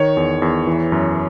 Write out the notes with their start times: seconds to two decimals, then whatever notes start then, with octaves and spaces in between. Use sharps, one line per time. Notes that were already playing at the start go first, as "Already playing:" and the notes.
Already playing: D#3 C#5
0.17 E2
0.42 E2
0.67 E3
0.92 F#2